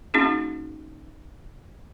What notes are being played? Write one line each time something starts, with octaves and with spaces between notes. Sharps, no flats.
A#3 C4 C#4 D#4 F#4 G#4